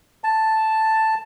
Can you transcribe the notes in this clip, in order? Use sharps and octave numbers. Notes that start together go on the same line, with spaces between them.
A5